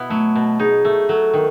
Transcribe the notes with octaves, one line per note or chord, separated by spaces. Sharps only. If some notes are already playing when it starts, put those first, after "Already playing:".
Already playing: B2 B3 E4
F#3 A3
B2
D#4 G#4
A3
F#3 A4
D#3